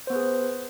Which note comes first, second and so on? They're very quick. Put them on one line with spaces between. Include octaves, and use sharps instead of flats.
C5 B3 B4 G#4